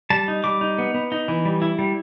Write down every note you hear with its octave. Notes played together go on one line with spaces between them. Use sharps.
G3 A5
D#4
G3 D6
D#4
B3
B3
D#4
E3
G3
E4
G3